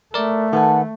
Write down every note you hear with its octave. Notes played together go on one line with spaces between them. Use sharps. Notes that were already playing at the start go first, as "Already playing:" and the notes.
A3 A#4 D5
D#3 A4 B4 F#5 G#5